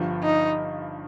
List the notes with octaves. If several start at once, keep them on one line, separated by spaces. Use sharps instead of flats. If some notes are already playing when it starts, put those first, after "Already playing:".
Already playing: G1 G2 F3
D#4